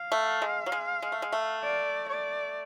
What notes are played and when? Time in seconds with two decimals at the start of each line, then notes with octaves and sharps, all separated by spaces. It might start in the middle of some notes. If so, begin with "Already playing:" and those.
Already playing: F5
0.12 A3
0.42 G#3
0.66 F#3
0.72 G#3
1.02 G#3
1.12 A3
1.22 G#3
1.32 A3
1.63 D5
2.09 D5